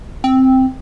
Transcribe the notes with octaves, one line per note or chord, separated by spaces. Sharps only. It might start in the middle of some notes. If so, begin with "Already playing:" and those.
C4